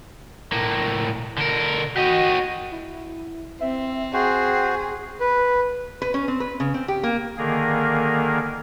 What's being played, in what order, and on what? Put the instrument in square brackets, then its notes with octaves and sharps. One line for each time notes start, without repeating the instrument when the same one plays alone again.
[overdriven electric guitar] A2 A#3
D3 A#4
[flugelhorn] F#4 [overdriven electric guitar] G4 D#5
[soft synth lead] E4
[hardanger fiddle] C4 [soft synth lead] E5
[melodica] F#4 C5 [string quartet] G#4 [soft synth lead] G5
[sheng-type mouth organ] B4
[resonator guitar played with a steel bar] B4
C#4
C4
B4
C#3
C4
G4
A#3
[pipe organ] D3 D#3 A#3 G#4 A#4